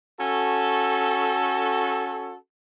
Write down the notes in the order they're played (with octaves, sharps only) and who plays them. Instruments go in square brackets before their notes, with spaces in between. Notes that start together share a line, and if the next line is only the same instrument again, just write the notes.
[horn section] C#4 F#4 A4